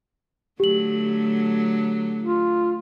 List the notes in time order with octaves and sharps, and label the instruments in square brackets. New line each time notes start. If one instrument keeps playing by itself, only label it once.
[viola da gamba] D3 F#3 A3 [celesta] G4 F#7
[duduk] F4